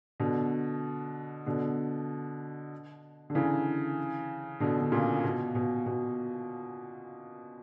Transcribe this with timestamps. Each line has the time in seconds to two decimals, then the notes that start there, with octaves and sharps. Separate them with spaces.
0.20 B2 D3
1.46 B2 D3
3.30 D3
3.35 C#3 E3
4.60 B2 D3
4.80 D3
4.92 A#2 C#3
5.24 B2
5.55 B2
5.86 B2